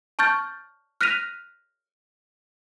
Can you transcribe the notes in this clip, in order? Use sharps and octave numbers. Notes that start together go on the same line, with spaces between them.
A5 C#6 F6 G6 A6
F6 F#6 A#6 B6 D#7 F7